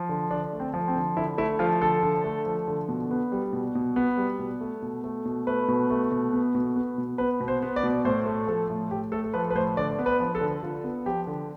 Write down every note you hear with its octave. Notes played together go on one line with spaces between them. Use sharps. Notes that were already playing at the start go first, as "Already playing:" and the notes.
Already playing: F3
D3
D3 D4
A3
C4
F3
C4
D3
D3 E4
A3 E4
F3 F4
D3 A4
D3
A3
F3
D3
B2
B3
G3
B2
B2
B3
G3
B2
A3
B2
A3
B2
A3 B4
B2
A3
B2
B3
B2
B3
B2
B3 B4
B2
C5
B3
D5
B2
A2 C5
A3
F3 A4
A2
A2 G4
A3 A4
A4
F3 B4
B4
A2 C5
D3 D5
B3
B4
F3
A4
D3
D3 F4
B3
F3 G4
D3